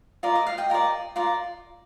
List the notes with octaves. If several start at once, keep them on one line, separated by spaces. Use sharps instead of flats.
F4 A#4 D5 D#5
D#5
F5
D#5 G5
F4 A#4 D5
F4 A#4 D5